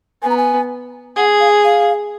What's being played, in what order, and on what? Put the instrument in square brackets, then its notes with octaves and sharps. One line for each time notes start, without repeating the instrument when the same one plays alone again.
[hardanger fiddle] B3 [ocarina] G#5
[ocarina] A#5
G#5
[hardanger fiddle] G#4 [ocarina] F#5
[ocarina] F5
F5